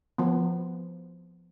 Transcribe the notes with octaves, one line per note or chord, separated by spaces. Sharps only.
F3 B3